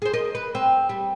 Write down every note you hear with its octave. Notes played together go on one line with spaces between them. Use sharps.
G#4 C5
A#4 D#5
B4
C4
G3